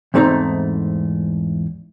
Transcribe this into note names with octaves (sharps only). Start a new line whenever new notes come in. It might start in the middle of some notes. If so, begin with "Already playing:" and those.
E2 G#2 A3 C4 D#4 A#5